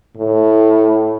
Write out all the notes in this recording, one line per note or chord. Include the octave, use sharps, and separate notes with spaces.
A2